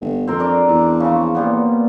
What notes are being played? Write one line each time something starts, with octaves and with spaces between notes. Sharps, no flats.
G1
F2 C4 A#4
D4 A#4 D5
E2
C#3 F3
A#2 G3 B3